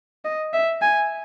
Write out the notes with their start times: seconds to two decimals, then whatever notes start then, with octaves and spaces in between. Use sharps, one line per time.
0.25 D#5
0.54 E5
0.82 G#5